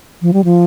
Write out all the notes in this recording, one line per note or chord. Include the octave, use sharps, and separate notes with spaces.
F3
G3
F3